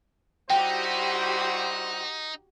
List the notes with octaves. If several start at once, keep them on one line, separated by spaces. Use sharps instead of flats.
G3 D#4 E4 F#4 G4 C5 G5